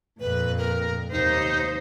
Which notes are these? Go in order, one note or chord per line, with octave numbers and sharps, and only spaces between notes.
F2 A#2 B4
A#4
D#2 C3 D#4 C5 D#5